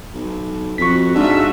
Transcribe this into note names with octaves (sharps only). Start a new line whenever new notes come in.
B1
F2 F#4 C#6 B6
G#2 D4 F4 F#4 E5